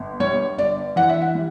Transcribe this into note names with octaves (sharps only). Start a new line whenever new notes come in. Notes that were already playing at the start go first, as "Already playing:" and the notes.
Already playing: G1
G3 C#5
G1 D5
E3 F#5
E5
F#5
G3